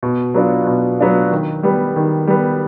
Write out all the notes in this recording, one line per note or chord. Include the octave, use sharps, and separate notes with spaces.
B2
F#3 B3 D4 F4
B2
F#3 B3 D4 F4
D#3
G3 B3
D#3
G3 B3